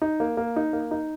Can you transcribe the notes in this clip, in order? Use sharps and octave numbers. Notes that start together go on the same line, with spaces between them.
D#4
A#3
A#3
D#4
A#3
D#4